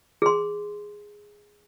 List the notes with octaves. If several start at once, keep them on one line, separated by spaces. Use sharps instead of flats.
G#4 C6